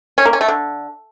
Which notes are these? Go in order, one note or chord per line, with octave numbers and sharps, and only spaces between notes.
C#4
A#3
C#4
A3
D3